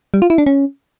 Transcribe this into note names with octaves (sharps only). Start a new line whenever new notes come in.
G3
F4
E4
D4
C#4